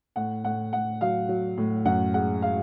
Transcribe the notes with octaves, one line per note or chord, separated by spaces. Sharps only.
A2 F#5
A2 F#5
A2 F#5
F#3 F5
F#3
A2
F#2 F#5
G#3 F#5
G#3 F5